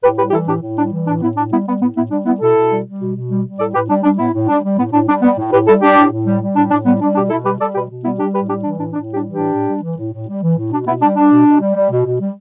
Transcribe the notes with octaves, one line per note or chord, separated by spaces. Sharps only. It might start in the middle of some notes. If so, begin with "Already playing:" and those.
A2 G4 B4
G3 G4 B4
G4
E3 E4 A4
A2 D4 G4
A2
G3 D4
E3
A2 D4
A2 B3 E4
A2 D4
G3 B3 E4
G3 B3
A2 B3
A2 B3 E4
G3 D4
G3 B3 E4
B2 E4 A4
B2
G3
G3
B2
B2
G3
G3
A2 A4 D5
A2 G4 B4
G3 D4
G3 D4
A2 B3 E4
A2
G3 D4
G3
A2 B3
A2 D4
G3 D4
G3 B3
A2
A2 G4 B4
G3 E4 A4
G3 D4 G4
A2
A2
G3
G3
A2 D4
A2 D4
G3 B3
G3 D4
B2 D4 G4
B2 E4 A4
G3 G4 B4
G3 A4 D5
B2 G4 B4
B2
G3 B3 E4
G3 D4 G4
A2 G4 B4
G3 D4 G4
E3 D4
A2 D4
A2 D4
G3
D4 G4
E3
D4 G4
A2
A2
G3
E3
A2
A2
G3
E3
A2
B2 D4
B2 B3 E4
G3 D4
G3 D4
B2
B2
G3
G3
B2
B2
G3